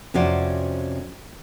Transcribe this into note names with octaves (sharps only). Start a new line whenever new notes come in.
F2 C3 C#4 F#4 C5 D5